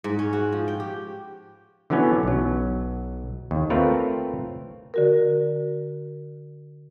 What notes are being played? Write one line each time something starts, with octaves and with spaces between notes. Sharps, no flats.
G#2
C#4
F#4
F3
G5
G4
D3 E3 F#3 B3 C#4
B1 F#3
D#2
A3 C4 F4 A#4 B4 C#5
D3 F#4 A#4